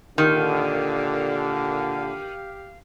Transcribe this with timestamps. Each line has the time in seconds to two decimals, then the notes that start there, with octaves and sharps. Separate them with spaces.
0.18 A#2 D3 D#3 G4 F5